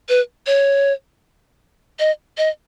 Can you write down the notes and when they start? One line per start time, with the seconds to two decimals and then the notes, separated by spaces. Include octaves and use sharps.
0.09 B4
0.47 C#5
1.99 D#5
2.38 D#5